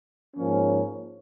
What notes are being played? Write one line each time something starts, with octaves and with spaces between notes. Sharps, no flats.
G#2 F3 A#3 C#4